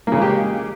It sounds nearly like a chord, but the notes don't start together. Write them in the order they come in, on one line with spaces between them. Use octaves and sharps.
A#3 C#3 G#3 G4